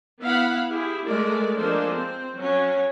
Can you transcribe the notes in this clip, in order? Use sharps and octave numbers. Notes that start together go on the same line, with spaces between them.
B3 E4 F5 F#5 B5
E4 G4 G#4
G#3 A3 A#4 D5
F3 G#3 A#3 D4 A4 C5
C4
F#3 C#4 C#5